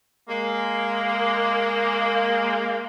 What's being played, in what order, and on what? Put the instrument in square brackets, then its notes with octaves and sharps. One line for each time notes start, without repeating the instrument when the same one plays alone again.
[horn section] G#3 A#3